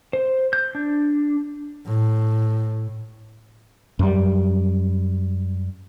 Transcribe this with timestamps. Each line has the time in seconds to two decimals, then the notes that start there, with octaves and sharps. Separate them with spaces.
0.13 C5
0.53 G6
0.75 D4
1.86 A2
3.99 F#2 G3